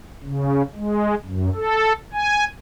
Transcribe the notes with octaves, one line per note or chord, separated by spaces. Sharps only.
C#3
G#3
F#2
A4
G#5